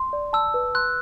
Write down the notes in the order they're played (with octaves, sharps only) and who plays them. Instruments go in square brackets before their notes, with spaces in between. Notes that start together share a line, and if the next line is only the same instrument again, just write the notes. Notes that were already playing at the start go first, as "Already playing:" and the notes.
Already playing: [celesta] C6
D5
[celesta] A5 [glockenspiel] E6
[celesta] B4
[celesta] C6 [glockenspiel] F#6